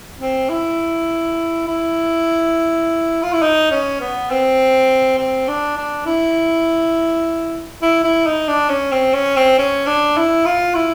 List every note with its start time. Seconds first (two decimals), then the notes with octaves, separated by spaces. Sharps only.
0.19 C4
0.49 E4
1.67 E4
3.22 F4
3.33 E4
3.42 D#4
3.71 C#4
4.00 B3
4.31 C4
5.18 C4
5.48 D4
5.77 D4
6.06 E4
7.82 E4
8.04 E4
8.26 D#4
8.48 D4
8.69 C#4
8.92 C4
9.14 C#4
9.36 C4
9.58 C#4
9.87 D4
10.17 E4
10.45 F4
10.75 E4